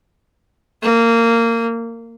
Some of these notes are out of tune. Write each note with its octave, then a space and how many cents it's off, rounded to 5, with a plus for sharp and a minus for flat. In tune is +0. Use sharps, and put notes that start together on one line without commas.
A#3 -20